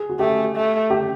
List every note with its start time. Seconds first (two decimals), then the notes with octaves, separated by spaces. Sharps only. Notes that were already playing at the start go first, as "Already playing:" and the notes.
Already playing: G#4
0.09 F#4
0.19 A3 G4
0.56 A3
0.90 G4